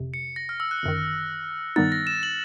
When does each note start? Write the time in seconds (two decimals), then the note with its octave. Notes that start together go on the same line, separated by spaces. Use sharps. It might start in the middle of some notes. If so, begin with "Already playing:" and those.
Already playing: G1 F2 C3
0.14 C#7
0.36 A#6
0.49 F6
0.60 E6
0.71 F#6
0.83 G1 F#2 D#3
1.76 G2 D#3 G3 B3 D#4 A6
1.92 A#6
2.07 E7
2.23 F#7